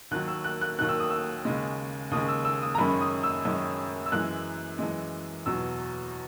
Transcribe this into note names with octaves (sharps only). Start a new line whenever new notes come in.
D#2 D#3 F#3 F#6
E6
F#6
F#6
D#2 D#3 F#3 F#6
E6
D#6
E6
D#2 C#3 G#3
D#2 C#3 G#3 D#6
E6
E6
D#6
A#5
F#2 D#3 G#3 C#4 B5
D#6
E6
F#2 D#3 G#3 C#4
E6
F#2 E3 G#3 F#6
F#2 E3 G#3
E2 B2 F#3 E6